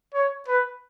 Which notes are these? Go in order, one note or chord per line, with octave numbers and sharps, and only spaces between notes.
C#5
B4